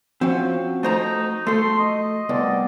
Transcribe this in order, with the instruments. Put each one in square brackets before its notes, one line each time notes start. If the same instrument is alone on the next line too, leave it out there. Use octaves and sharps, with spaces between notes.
[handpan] F3 F#4 [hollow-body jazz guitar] C4 C#4
[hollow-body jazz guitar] A3 C5 A#5 [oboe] D#4
[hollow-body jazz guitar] A3 A4 [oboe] C6
[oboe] D#5
[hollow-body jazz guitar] C2 [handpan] B3 D5